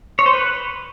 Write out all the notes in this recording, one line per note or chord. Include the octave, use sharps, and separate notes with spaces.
C#5
C5
B4